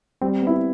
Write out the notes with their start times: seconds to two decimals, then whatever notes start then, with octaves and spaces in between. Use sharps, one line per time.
0.21 G3 C4
0.42 B3
0.47 E4